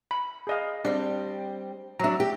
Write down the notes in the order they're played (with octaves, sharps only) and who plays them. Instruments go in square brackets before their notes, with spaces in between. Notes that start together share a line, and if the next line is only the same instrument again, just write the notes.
[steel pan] B5
G#4 D#5 F5
[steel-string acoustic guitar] G3 C4 [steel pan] D4
[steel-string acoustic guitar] F#3 D4 [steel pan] E5 A#5
[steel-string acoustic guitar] G4